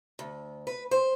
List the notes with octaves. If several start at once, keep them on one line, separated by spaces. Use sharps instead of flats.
D2
B4
C5